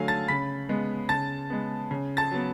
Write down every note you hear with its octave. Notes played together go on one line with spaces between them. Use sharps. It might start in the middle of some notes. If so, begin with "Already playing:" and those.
Already playing: D3 F#3 A3 F5 G#5
A5 A6
C#3 B5 B6
G#3 B3
C#3 A5 A6
G#3 B3
C#3
A5 A6
F#3 B3